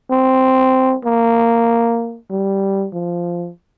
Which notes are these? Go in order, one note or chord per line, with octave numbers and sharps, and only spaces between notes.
C4
A#3
G3
F3